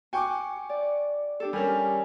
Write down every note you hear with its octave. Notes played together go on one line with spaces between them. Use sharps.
F#4 G5 G#5 C#6 D6
D5
D4 G4 A4
G3 C#4 A#4 G#5